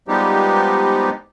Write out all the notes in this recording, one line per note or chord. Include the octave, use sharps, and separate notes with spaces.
F3 G3 G#3 B3 D#4 G4